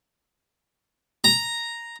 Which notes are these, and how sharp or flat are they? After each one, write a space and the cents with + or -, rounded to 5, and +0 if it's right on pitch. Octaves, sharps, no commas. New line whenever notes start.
A#5 +0